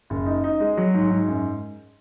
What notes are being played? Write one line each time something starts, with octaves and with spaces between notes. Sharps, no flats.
F#1
D#4
D#4
G#3
F#3
G#2
G#2
F#2